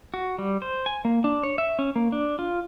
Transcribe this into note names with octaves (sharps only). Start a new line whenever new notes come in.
F#4
G3
C5
G#5
A#3
D4
C#5
E5
C#4
A#3
D4
F4